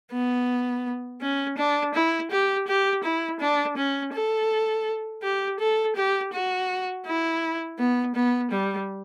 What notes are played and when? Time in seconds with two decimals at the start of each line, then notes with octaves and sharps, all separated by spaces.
0.12 B3
1.21 C#4
1.57 D4
1.94 E4
2.31 G4
2.67 G4
3.03 E4
3.40 D4
3.77 C#4
4.13 A4
5.22 G4
5.59 A4
5.96 G4
6.33 F#4
7.06 E4
7.78 B3
8.15 B3
8.51 G3